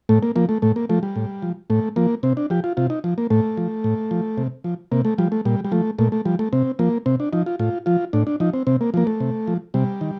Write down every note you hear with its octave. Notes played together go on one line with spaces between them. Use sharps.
A2 A3
A#3
F3 A#3
A3
A2 A3
A#3
F3 A3
G3
A2
F3
A2 A3
F3 A#3
C3 C4
D4
F3 G4
F4
C3 F4
D#4
F3
A#3
A2 A3
F3
A2
F3
C3
F3
C3 A#3
A3
F3 G3
A3
A#2 G3
G3
F3 A3
A#2 A3
A3
F3 G3
A3
C3 C4
F3 A#3
C3 C4
D4
F3 D#4
F4
A2 F4
F3 F4
A2 D4
D4
F3 D#4
C4
C3 C4
A#3
F3 A#3
A3
C3
F3
C3 G3
D#3